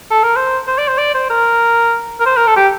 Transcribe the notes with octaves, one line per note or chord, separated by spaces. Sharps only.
A4
A#4
C5
C5
D5
C5
D5
C5
A#4
A#4
C5
A#4
A4
G4